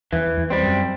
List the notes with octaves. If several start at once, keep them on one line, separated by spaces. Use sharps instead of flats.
E2 E3
E2
G3 C4
F#2